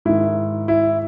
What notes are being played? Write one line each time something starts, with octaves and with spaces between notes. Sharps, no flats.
G#2 D#3 E4
E4